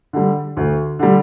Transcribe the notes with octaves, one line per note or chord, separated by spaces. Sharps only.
D3 G3
D2
D3 G3